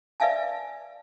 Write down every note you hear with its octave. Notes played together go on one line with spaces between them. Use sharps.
B4 D5 E5 F5 G#5 A5